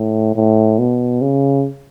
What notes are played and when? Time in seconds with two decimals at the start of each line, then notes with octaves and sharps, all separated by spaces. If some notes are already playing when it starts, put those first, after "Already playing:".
Already playing: A2
0.36 A2
0.79 B2
1.22 C#3